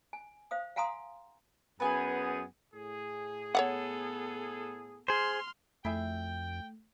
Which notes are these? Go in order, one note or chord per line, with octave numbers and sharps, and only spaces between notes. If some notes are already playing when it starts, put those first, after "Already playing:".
G#5
C5 F5 D#6
F5 F#5 G#5 A#5 C6 D#6
F#2 B3 G#4 B4 G#5
A2 G#4
B3 A4 C#5 F5 F#5
G#4 C5 C6 F6
F2 A3 E4 G#4 E5 G5